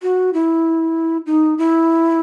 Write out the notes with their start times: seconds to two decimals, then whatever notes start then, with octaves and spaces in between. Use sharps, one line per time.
0.03 F#4
0.34 E4
1.26 D#4
1.58 E4